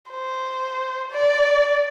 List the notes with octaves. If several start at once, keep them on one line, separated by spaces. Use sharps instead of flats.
C5
D5